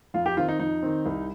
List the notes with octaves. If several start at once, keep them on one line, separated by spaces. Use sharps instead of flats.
F2 F4
G4
D#3 C4 F4
D#4
F2 D#4
D#3 C4
C2